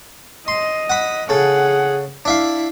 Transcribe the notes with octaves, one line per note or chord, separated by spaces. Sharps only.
D#5 C6
F#5 B5
C#3 G#4 A4 F#5
D4 E4 E5 F5